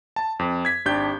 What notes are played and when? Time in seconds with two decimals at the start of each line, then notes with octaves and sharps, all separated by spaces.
0.16 A5
0.39 F2
0.65 G#6 B6
0.85 G#1 D4 G4 G6